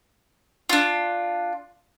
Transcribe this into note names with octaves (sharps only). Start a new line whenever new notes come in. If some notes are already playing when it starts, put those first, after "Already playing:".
D4 F4